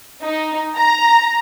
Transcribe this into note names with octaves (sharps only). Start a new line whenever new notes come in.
D#4
A#5